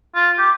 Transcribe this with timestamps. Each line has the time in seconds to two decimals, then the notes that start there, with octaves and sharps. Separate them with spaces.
0.15 F4
0.38 G4